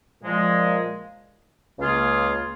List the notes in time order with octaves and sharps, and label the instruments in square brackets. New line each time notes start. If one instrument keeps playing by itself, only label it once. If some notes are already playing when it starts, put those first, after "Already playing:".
[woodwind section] A#2 F3 G#3 F4
C#2 C#3 A#3 F4 G#4